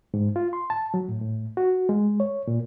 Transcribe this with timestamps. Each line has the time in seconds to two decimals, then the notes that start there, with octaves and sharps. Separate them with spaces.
0.14 G#2
0.36 F4
0.53 C6
0.70 A5
0.94 F#3
1.09 A2
1.22 A2
1.57 F#4
1.89 G#3
2.20 C#5
2.47 A#2